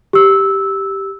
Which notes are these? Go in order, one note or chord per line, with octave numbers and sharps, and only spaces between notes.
G4 E6